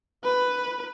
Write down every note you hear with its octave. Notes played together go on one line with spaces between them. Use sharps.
B4